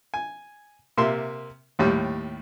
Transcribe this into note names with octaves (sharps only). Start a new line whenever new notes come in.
G#5
C3 A#3 E5 C6
D#2 A2 G3